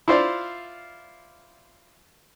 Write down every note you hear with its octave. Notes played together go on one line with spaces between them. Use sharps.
E4 F4 C5 D5 F5